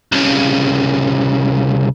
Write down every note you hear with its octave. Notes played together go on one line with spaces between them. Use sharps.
C2 C#3